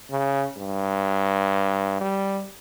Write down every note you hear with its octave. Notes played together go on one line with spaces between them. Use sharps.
C#3
G2
G3